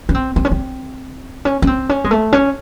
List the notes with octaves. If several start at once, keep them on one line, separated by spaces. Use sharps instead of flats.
C#4
C4
C4
C#4
C4
C#4
C#4
C4
C#4
G#3
A3
C#4